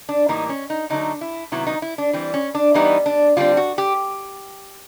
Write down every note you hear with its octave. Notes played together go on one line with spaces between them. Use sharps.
D4
A2 E3 G3 A#3 D#4
C#4
D#4
D3 F#3 A3 D#4
E4
C3 D#3 F#3 B3 E4
D#4
E4
D4
E3 G3 C4
C#4
D4
E3 G3 B3 D#4
D4
D3 G3 C4 F4
F#4
G4